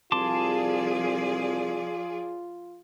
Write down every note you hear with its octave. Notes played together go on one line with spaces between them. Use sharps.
C2 F3 F4 G#4 D5 A5 C6 D6